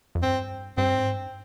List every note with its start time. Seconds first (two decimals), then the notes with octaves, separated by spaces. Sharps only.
0.15 F2
0.23 G2 C4
0.77 G2 C4
0.95 G#2
1.14 G2